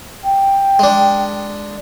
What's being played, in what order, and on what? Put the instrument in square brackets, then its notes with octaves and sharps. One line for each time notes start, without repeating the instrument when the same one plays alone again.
[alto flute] G5
[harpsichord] G#3 D4